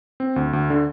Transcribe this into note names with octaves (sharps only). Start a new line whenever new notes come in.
C4
D2
D2
D3